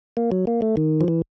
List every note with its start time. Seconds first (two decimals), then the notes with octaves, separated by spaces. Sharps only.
0.17 A#3
0.32 F#3
0.47 A#3
0.62 A3
0.77 D#3
1.01 F3
1.08 E3